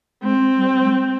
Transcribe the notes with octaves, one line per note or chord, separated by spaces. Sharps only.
G#3 C4
G3
G#3